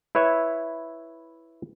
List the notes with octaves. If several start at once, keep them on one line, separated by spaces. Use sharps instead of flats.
E4 B4 C#5 E5